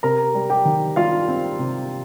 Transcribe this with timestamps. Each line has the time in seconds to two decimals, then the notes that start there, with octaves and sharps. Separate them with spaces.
0.03 C3 A#4 A#5
0.35 G3
0.50 G4 G5
0.65 D#3
0.96 G3 F4 F5
1.28 C4
1.59 C3